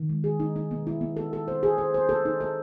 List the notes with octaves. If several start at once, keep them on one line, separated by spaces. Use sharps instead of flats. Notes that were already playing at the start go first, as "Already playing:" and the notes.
Already playing: D#3
G#3
G#4
D#4
D#4
B3
E4
B3
A4
A4
C5
G#4
C5
C5
A4
D#4
A4